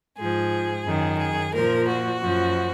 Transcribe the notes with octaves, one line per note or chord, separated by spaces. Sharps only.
G#2 F3 G#4
F#2 D#3
G#4
A#2 F3 A#4
F#4
F#2 F3